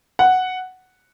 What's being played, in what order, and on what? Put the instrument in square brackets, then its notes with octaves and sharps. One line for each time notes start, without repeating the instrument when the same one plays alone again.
[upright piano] F#5